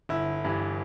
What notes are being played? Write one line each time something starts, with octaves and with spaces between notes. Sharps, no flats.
G1 E4
G2 E3 G3